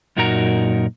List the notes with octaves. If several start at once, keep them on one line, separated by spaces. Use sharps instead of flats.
F#2 A#2 D#4 F#4 A#4 A#5